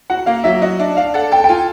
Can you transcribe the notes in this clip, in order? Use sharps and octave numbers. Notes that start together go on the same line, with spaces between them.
F#4 F#5
A#3 F5
F#3 E5
F#4 D#5
D4 E5
D4 F5
A4 F#5
A4 G5
G5
F4 G#5